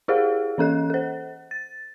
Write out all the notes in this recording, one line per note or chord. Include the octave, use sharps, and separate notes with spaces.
E4 G4 G#4 C5 F5
E3 C#4 A4 F#6
A4 C5
A6